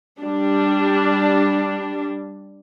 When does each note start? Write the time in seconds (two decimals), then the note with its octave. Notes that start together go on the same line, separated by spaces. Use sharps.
0.19 G3 D4